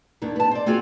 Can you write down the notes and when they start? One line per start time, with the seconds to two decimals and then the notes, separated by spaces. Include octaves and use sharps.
0.22 D#2 D#3 D4
0.36 B3 A5
0.51 C5 D5
0.66 C4 F4 F#4 G#4 F5